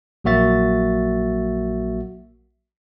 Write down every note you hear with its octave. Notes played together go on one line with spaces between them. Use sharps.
A#1 F#3 A#3 F#4 E5 A6